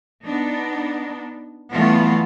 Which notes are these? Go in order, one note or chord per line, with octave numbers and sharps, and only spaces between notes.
B3 D4 D#4
E3 F#3 G3 A3 B3 F4